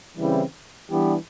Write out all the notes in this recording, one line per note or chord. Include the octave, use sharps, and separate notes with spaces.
C#3 E3 G3 C4 E4
E3 G3 B3 D4 G4